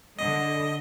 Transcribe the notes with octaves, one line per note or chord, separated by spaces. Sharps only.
D3 D#5